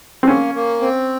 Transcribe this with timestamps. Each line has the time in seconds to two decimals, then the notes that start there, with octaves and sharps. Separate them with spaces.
0.23 C4
0.28 A#3 C#4
0.55 A#3
0.81 C4